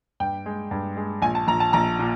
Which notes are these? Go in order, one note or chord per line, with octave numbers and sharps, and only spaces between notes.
G2 G5
G#3
G2
G#3
A#1 G#5
A5
A#1 A#5
A5
A#1 A#5
A#2